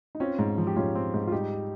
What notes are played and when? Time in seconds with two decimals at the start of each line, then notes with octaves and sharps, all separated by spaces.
0.15 D#4
0.20 C4 C#4 F4
0.39 G#2
0.58 F3
0.67 G4
0.76 G#2 C#4 F4
0.95 C4
1.14 G#2
1.27 F4
1.32 G3 D#4 G4